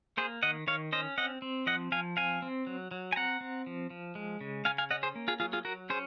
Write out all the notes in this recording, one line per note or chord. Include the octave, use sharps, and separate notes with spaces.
A#3 G#4 C5
D#3 D#5 F#5
D#3 C#5 F5
C#4 C5 D#5
C4 D#5 F#5
C4
F3 D#5 F#5
F3 F5 G#5
C4 F5 G#5
C4
F#3
F#3
G#5
C4 F#5 A#5
C4
F3
F3
G#3
C#3
C#3 F5 G#5
F5 G#5
C#4 D#5 F#5
G#4 C5
A#3
F4 G#4
F#3 F4 G#4
F4 G#4
F#3 F#4 A#4
C#4 G#4 C5